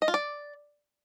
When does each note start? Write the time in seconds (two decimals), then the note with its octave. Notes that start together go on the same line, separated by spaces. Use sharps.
0.02 D#5
0.08 F4
0.14 D5